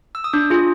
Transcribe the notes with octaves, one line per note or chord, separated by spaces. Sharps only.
E6
D#6
D4 D6
F4 G#4